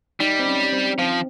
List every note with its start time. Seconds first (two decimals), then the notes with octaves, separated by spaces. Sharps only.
0.20 G3 D#4
0.39 C4
0.46 C#4
0.72 C4
0.99 F3 C4